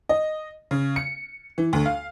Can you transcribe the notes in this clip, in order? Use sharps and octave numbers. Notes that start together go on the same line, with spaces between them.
D#5
C#3
C#7
E3
D2
F5